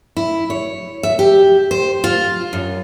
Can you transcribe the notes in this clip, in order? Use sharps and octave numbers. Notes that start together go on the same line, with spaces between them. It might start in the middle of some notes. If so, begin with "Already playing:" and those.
E4
C#5
E5
G4
C5
F4
F#2